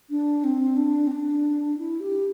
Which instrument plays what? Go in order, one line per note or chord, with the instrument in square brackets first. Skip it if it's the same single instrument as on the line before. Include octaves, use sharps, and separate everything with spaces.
[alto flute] D4
C4
D4
C4
D4
E4
G4